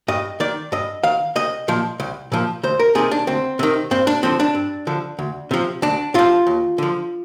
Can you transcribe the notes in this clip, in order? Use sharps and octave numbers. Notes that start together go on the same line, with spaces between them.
G2 D#5
D#3 D5
G2 D#5
D#3 F5
C2 D#5
A#2 F3
C2
A#2 F3
D2 C5
A#4
C3 D#3 G#4
D4
D2 C4
C3 D#3
G2 C4
D4
D3 F3 C4
D4
G2
D3 F3
D2
C3 F3
D2 D4
C3 F3 F4
D#2
D3 F3